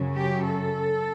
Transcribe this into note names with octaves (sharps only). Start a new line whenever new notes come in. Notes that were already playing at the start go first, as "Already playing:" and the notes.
Already playing: F#2 C#3 F#3
G4
A4